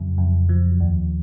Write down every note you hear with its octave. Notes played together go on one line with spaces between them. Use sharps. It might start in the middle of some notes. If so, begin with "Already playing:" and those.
Already playing: F2 C#3 F#3
F2
F3
D#2